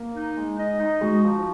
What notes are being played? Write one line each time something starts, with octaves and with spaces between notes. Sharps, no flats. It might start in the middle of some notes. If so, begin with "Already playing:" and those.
Already playing: A#3
D#4
G#3
D#5
D#4
G#3 F#4
F3